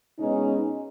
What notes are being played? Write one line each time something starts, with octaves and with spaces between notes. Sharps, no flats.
B2 G#3 C#4 D#4